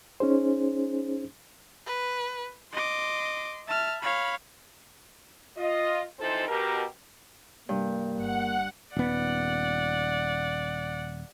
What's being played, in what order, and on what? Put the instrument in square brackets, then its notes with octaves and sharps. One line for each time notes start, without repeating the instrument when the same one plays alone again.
[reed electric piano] C#4 D#4 G#4 C5
[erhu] B4
[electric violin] D#5 D6 [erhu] C6
[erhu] E5 [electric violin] A5 F6
[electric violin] C#5 F5 [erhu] B5
[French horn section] F4 D#5
E3 F3 C4 D#4 A4 C5
B2 G4 A#4
[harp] G2 [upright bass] C3 [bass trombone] A#3
[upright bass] G1 D3 [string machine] F#5
[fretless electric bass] D#1 B3 [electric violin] D5 F#5